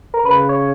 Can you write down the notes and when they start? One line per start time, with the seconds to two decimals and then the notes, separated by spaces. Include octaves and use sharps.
0.14 A#4
0.25 C#3 B4
0.49 C#5